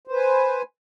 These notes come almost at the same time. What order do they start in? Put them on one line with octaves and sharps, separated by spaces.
C5 B4 G#5